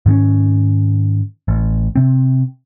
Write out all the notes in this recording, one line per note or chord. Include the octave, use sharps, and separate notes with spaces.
G#2 D#3 C4 C#4
A1
C3 C4